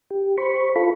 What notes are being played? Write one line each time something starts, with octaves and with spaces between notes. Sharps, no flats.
G4
C5 B5 C#6
F4 A4 B5